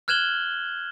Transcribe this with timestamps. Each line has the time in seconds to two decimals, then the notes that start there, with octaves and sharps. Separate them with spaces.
0.08 F6 F#6 G#6 E7 F#7 G7